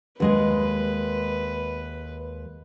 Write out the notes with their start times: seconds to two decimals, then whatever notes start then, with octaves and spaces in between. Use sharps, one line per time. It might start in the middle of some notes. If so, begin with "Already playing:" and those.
0.20 D#2 G#3 B4 D#5